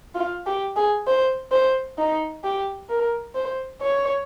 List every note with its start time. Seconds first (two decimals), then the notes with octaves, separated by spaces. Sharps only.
0.15 F4
0.46 G4
0.77 G#4
1.07 C5
1.52 C5
1.98 D#4
2.44 G4
2.89 A#4
3.35 C5
3.81 C#5